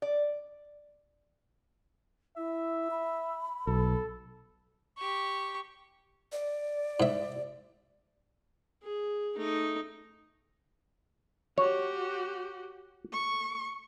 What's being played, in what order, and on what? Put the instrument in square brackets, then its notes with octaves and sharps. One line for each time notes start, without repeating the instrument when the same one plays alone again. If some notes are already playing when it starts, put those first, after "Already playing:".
[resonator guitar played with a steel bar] D5
[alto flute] E4 [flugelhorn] E5
[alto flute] B5
[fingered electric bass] B1 [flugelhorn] A4
[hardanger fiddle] G4 C#6
[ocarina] D5
[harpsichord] G#2 E5
[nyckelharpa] G#4
A3 D#4
[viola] F#4 G4 [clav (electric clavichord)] C#5
[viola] C#6